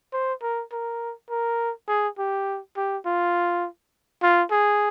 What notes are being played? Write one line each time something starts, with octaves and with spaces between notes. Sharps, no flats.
C5
A#4
A#4
A#4
G#4
G4
G4
F4
F4
G#4